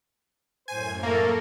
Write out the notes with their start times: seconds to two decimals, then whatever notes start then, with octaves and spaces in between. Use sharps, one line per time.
0.68 F#2 A2 C5 G#5 G#6
1.03 A3 A#3 A4 A#4